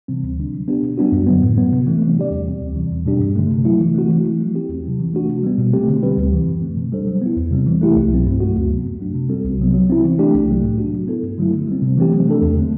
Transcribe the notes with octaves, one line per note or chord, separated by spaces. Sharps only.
C3 E3 G3 C4
D2
D3 G3 D4
F#3
B3 D4 G4
B2
G3 B3 D4 F#4
F#2
D3 F#3 B3
A2
F#3 B3
C3
E3 A3 C4
E3
G3 D4 G4 D5
E2
B2 G3 C4
D2
C3 E3 G3 C4
E2
B2 G3 D4 G4
G2
D3 A3
C3
F#3 A3 E4
E3
A3 C4 F#4
E3
A3 E4
F#3
C4 E4 G4
E2
C3 F#3 C4
E3
A3 D4 F#4
C3
G3 B3
B2
A3 C4 G4
D3
G3 C4 G4 B4
D2
C3 E3
F#2
D3 A3 C4
B2
G3 D4 A4 C5
F#3
B3 E4
E2
C3 G3 C4
E3
A3 E4 G4
C2
B2 F#3 C4
G2
F#3 A3 C4 F#4
D2
C3 F#3 B3
F#2
F#3 A3 D4
C3
G3 C4 F#4 A4
C2
C3 F#3 B3
F#3
C4 E4
E3
A3 D4 G4
C2
C3 F#3 A3
A2
F#3 A3 D4 F#4
F#3
B3 E4 A4
G2
D3 F#3 A3 E4
D3
G3 C4
C3
E3 A3 C4 G4
F#3
A3 D4 A4
E2
D3 A3 C4